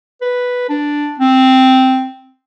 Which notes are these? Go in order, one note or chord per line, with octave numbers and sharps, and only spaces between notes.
B4
D4
C4